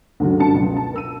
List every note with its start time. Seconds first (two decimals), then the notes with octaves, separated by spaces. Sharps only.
0.20 D2 G2 C#3 F#3
0.39 F#1 G2 F#4 A5 C#7
0.55 C#2 B2 F#3
0.76 A5
0.93 A#4 E6 D#7